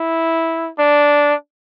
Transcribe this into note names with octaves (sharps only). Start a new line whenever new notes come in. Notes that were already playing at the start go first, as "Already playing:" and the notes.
Already playing: E4
D4